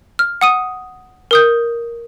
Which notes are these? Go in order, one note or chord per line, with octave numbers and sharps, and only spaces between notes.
F6
F#5 D#6 D#7
A#4 D#6 G6